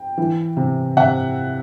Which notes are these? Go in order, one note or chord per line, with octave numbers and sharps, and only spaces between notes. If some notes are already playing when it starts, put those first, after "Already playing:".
Already playing: G5
E3
C3
C3 E5 F#5